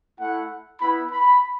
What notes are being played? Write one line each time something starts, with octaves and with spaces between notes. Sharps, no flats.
A3 E4 F#5
B3 E4 B5
B5